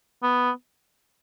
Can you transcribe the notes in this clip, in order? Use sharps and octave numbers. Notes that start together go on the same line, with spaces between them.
B3